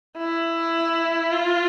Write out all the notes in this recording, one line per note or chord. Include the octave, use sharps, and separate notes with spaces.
E4
F4